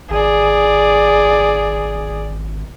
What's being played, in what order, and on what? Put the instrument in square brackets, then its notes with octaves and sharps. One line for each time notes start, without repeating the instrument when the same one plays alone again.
[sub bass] G#1 [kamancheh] G#4 D5